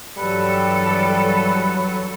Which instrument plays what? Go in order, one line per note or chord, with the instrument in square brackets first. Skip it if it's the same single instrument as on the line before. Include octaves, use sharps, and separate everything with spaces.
[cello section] G2 E3 A4 [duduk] F#3 [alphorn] G3 [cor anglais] B4